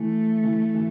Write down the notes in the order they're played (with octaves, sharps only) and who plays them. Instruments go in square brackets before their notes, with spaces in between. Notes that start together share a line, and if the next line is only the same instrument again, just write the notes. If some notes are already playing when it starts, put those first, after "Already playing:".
Already playing: [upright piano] E3 [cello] A3
[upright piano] E3
E3